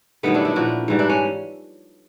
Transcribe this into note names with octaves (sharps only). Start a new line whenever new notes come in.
G2 D#3 F#3 A3 B3
D4 E4
D4 E4
A#2 F3 E4 F#4
G#2 E3 G3
D4 E4
C#4